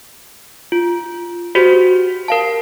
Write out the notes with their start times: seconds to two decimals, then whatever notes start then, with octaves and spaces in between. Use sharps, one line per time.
0.72 F4
1.55 F#4 G4 C5
2.28 A#4 F5 A5